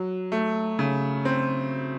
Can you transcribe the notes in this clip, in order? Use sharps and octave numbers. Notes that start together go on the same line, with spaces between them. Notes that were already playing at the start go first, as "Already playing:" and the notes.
Already playing: F#3
A3
C#3
C4